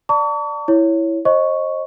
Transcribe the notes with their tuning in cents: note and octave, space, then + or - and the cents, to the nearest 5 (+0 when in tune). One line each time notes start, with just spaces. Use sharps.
D5 +0 A5 +40 C#6 +45
E4 +0 C#5 +0
C5 +30 D#5 +0 C#6 +0